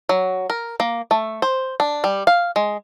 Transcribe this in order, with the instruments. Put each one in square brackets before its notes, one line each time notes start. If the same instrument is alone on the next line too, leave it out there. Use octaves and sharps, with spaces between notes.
[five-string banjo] F#3
A#4
A#3
A3
C5
D4
G3
F5
G#3